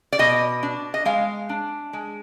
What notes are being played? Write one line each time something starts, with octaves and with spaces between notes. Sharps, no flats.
D5
B2 D#5
D4
D#5
G#3 F5
D4
G#3